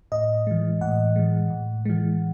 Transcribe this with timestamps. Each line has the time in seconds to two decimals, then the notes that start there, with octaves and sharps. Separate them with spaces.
0.12 A2 D#5
0.47 E3 G#3
0.81 A2 F#5
1.16 E3 G#3
1.50 A2
1.85 E3 G#3